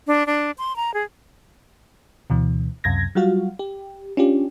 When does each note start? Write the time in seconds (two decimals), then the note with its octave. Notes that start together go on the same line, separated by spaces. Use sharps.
0.07 D4
0.27 D4
0.58 C6
0.76 A#5
0.94 G#4
2.30 D2 B2 E3
2.84 C#2 F#2 C3 G#6 A#6
3.15 F#3 G3 F4 F#4 F5
3.59 G4
4.17 C#4 D4 F4 G4